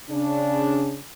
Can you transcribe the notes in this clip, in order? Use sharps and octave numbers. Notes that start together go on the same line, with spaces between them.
C#3 D4